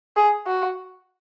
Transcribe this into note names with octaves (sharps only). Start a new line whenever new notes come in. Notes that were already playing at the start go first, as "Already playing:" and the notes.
G#4
F#4